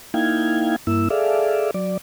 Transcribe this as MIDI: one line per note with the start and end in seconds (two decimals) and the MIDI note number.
0.14 0.76 58
0.14 0.76 63
0.14 0.76 64
0.14 0.76 77
0.14 0.76 79
0.14 0.76 92
0.87 1.09 43
0.87 1.09 58
0.87 1.09 64
0.87 1.09 88
1.10 1.71 68
1.10 1.71 69
1.10 1.71 74
1.10 1.71 76
1.10 1.71 77
1.74 1.97 54
1.74 1.97 74